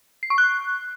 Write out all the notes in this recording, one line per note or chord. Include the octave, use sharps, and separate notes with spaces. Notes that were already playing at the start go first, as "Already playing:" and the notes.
C7
C#6
F#6